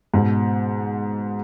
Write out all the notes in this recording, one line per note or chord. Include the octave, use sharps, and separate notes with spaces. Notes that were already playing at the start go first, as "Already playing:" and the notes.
G#2 B2